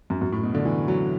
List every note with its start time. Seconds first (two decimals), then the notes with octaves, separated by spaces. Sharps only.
0.10 F#2
0.22 F#2
0.32 A2
0.43 B2
0.54 D3
0.65 E3
0.88 F#3